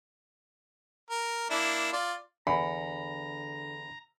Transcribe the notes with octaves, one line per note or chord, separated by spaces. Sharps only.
A#4
A#3 D4 E4
F4 D5
E2 D3 A#5 B5